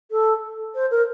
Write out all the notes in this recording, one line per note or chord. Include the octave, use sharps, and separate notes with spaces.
A4
C5
A#4